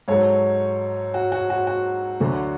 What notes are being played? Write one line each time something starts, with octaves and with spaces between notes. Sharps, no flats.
G#2 F#3 A4 C#5
F#4
F#4
F#4
F#4
D2 D3 F#3